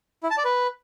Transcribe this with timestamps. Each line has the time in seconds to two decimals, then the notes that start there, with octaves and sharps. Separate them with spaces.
0.23 E4
0.30 A5
0.38 D5
0.45 B4